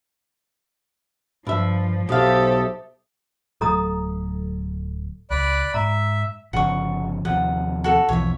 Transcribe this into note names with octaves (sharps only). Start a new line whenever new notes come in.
G2 F3 E5
B1 G4 A4 C5 E5 F5 D#6
D1 F#3 A3 A4 A#5 D#6
C#2 D5 B5 F#6
G#2 E5 A#5
G1 C#3 F3 F#5 C#6
D#2 C3 F3 F#5
F#4 A4
B1 E2 F3 C#5 E5